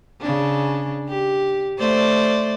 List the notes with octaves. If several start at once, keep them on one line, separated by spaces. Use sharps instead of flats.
C#3 D4
G4
A3 C5 D5